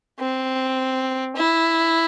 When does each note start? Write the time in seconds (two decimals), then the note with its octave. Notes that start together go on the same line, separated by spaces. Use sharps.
0.19 C4
1.36 E4